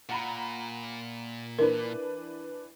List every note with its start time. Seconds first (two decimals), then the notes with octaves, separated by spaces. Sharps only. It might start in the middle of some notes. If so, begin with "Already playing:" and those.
0.09 A#2 F#5 A#5 B5
1.59 E3 D4 A#4 B4